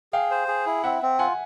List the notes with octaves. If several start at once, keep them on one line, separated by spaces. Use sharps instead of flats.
G#4 F5 G5
C5
G#4
E4
C4 E5 F#5
C4
F4 F#5 G#5